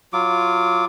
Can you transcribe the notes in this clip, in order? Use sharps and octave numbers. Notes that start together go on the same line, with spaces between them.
F#3 F4 D6